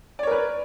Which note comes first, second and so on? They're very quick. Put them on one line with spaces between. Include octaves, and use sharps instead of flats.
D5 C#5 A#4 B4